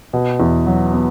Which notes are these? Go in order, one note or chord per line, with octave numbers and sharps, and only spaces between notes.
B2
E2
F#3
B3